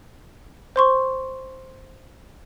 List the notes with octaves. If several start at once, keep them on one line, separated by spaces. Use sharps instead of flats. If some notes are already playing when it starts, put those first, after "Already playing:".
C5 C6 C#6